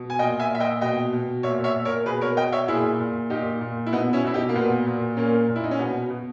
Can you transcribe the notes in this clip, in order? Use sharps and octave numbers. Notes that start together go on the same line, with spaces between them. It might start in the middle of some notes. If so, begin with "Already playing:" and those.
Already playing: B2
G#5
A#2 D#5 G5
E5 G#5
A#2 E5
D#5 G5
B2 D#5 G5
B2
A#2 C#5 E5
C#5 E5
A#2
A#4 C#5
B2 G#4 B4
A#4 C#5
B2 D#5 G5
C#5 E5
A#2 E4 G#4
A#2
A#2 D#4 G4
A#2
E4
B2 B3 D#4
C#4 E4
B2 E4
D#4 G4
A#3
A#2 B3
A#2
A#2 A#3 C#4
A#2
E4
D#4
C#4
B2 B3
B2